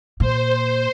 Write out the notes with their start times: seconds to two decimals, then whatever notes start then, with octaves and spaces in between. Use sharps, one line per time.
0.20 A#2 C5